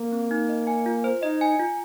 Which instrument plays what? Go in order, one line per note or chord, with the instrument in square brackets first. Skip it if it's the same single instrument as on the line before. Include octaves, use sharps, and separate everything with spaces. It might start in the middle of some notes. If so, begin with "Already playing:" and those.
Already playing: [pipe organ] A#3
[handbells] C4
D#4
D#5
G#5
F4
C5
[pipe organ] D#4 [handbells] D#5
[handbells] G#5
F4